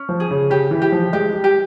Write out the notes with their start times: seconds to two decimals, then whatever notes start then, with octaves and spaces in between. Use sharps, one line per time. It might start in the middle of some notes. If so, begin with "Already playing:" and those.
Already playing: C#4
0.09 F3
0.20 G#4
0.31 C#3
0.50 C#3 G4
0.71 E3
0.82 G4
0.92 F3
1.13 G#3 G4
1.33 G3
1.44 G4